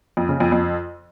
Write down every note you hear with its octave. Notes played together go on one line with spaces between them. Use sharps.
F2
C#3
F2
F2